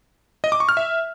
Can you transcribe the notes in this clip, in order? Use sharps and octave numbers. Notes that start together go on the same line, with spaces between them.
D#5
D6
C#6
F6
E5